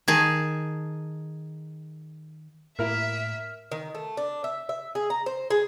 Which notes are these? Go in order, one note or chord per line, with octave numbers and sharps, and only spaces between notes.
D#3 G#4 A5
A2 A#3 E4 A#4 E5 F6
D#3
A3
D4
E5
E5
G#4
A#5
C5
G#4